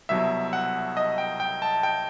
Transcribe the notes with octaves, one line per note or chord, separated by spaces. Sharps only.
C2 B2 F#3 E5
F#5
D#5
G5
G5
A5
G5